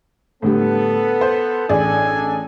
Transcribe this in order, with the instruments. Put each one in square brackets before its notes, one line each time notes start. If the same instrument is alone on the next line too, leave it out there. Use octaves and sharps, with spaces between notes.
[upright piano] A2 D3 G3 [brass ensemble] B3 A4
[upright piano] C5
[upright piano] A1 G#4 D5 [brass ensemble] D4 A4 G#5